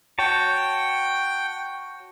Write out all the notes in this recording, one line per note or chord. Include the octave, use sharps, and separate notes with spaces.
F#4 C#5 G5 A5